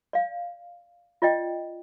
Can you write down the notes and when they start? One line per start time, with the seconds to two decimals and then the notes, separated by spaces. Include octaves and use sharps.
0.13 D5 F5
1.22 F4 D5 D#5 G5